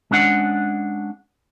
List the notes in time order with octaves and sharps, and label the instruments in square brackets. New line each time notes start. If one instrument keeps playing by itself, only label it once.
[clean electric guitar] G#3 C#4 D4 F#5